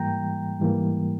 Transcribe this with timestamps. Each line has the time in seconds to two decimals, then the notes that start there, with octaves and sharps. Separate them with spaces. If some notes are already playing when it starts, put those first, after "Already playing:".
Already playing: G#2 E3 G3 A#3 G5 A#5
0.60 G#2 E3 G3 A#3